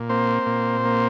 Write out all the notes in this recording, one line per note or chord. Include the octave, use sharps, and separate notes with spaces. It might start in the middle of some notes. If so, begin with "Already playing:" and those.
Already playing: A#2
A#3 C4 C5
A#2
A#3